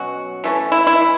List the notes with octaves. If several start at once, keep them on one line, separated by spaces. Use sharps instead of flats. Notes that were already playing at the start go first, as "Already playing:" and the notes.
Already playing: B2 F#3 C#4 F#4
E3 A3 C#4
E4
E4
E3